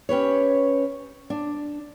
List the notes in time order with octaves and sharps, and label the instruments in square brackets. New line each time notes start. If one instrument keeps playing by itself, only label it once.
[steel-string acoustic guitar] C#4 G4 B4 C#5
D4